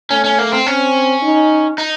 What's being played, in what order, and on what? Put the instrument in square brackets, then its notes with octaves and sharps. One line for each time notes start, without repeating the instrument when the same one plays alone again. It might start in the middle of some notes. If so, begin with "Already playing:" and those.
[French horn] A3 [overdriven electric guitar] C#4
[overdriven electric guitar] C#4
A#3
C4
[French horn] C4 [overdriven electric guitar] C#4
[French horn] D#4
[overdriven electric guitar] D#4